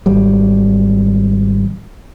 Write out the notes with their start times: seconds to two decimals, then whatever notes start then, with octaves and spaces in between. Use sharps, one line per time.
0.06 G#1 F#3 G3